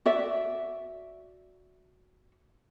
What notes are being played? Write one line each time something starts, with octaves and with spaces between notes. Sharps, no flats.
F#4 D5 E5